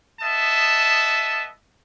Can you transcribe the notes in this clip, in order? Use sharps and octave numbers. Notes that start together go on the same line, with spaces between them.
B3 D#5 E5 A5